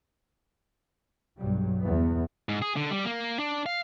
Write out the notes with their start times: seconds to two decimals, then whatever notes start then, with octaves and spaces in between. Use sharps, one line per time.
1.37 B1 G2 F#3 G3
1.82 E2 B3
2.49 G#2
2.62 G#4
2.76 D3
2.91 G3
3.05 A#3
3.39 D4
3.66 F5